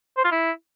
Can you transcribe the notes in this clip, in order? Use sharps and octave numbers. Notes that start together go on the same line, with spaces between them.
C5
F4
E4